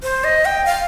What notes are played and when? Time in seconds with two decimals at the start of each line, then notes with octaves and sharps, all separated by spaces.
0.03 C5
0.24 D#5
0.45 G5
0.66 F5